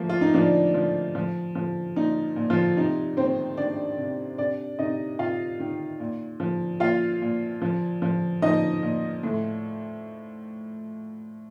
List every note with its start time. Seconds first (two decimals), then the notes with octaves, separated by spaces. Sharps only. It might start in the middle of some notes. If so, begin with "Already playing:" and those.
Already playing: A2 F3 A#3
0.09 F4
0.21 D#4
0.34 F3 D4
0.74 F3
1.15 F3
1.55 F3
1.96 A#2 D#4
2.36 A#2
2.50 F3 F4
2.76 C3 D#4
3.17 D#3 C4 C5
3.57 D#3 D4 D5
3.98 C3
4.38 C3 D4 D5
4.79 C3 D#4 D#5
5.19 C3 F4 F5
5.60 D#3
6.00 A#2
6.40 F3
6.80 A#2 F4 F5
7.22 A#2
7.62 F3
8.02 F3
8.42 F3 D#4 D#5
8.83 A#2
9.23 A2